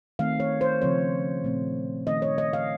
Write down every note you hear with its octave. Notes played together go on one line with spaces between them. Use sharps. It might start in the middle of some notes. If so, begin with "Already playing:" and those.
D#3 A3 C4 F5
C#5
C5
C#3 F3 C4 C#5
A#2 A3 C4
D#3 A3 C#4 D#5
C#5
D#5
F5